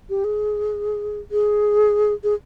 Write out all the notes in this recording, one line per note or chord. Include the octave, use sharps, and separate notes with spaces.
G4
G#4
G#4
G#4